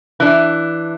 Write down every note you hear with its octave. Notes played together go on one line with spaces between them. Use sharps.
E3 D4